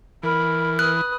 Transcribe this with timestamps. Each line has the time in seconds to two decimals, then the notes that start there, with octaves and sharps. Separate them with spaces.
0.23 E3 A#4 B5
0.79 B4 D#6 F#6